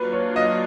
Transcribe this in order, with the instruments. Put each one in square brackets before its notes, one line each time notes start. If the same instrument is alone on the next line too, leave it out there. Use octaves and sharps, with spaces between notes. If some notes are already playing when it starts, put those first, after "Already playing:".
Already playing: [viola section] F#3 A#3 D4 F4 [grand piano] B4
[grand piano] C#5
D#5